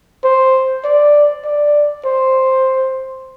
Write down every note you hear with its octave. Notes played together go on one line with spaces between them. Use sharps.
C5
D5
D5
C5